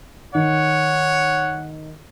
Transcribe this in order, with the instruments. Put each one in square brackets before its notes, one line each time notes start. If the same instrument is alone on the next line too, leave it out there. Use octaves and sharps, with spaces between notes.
[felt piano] D#3 [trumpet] C#5 [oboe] F#5